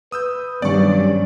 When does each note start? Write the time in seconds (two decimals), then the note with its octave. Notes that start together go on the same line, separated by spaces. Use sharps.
0.12 B4 D#6 E6 G6
0.62 G2 D#3 F#3 G3 B3 C#4 D5 C#6